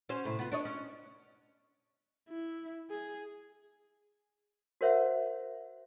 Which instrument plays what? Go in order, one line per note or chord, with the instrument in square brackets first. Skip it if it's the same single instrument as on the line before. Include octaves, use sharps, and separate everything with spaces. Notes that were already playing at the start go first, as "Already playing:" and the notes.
[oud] C#4 F#4 C5
A2 C3
B3 F4
D4 C#5 D#5
C#4
[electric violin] E4
G#4
[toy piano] F#4 A#4 C5 C#5 E5 F#5